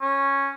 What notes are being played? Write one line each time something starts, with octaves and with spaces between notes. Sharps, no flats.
C#4